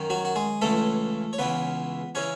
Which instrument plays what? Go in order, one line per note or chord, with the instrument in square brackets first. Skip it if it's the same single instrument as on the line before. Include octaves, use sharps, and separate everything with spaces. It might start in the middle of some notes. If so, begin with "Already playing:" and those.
Already playing: [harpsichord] F#2 D#3
F#3 F#4
F#4
G#3 G#4
C#2 C#3 E3 A3 A4
C#5
C#2 C#3 E3 B3 B4
C#3 E3 C#4 C#5